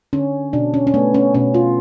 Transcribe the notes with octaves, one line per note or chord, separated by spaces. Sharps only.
D3 C#4
B2 D4
C#4
C#4
A3 B3
C#4
B2 C#4
F4